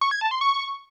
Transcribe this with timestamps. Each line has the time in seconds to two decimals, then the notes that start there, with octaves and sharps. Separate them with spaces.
0.01 C#6
0.11 G#6
0.21 A5
0.31 C6
0.41 C#6